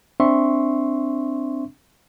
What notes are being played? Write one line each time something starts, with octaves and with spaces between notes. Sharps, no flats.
C4 D4 E5 C6 C#6